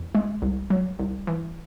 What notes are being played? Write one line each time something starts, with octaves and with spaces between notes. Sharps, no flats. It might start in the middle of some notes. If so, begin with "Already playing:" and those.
Already playing: E2
G#3
C2
F#3
C2
E3